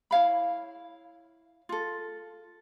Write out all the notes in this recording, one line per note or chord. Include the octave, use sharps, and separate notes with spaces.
E4 C#5 F5 B5
F4 A4